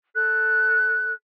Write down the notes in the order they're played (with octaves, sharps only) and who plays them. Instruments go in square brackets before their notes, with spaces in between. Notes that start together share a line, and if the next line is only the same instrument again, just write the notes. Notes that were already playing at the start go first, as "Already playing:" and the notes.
[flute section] A4 F#6